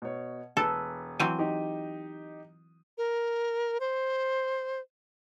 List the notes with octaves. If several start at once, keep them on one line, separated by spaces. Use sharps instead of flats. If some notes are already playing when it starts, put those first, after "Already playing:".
B2 C#5
E1 A4 B4
E3 F#3 C4 D#7
D#4 G4
A#4
C5